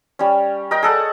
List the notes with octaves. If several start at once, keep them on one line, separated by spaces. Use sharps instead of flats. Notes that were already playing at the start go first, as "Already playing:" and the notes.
G3 C#4
A#4 D#5 G5
G#4 A4 F#5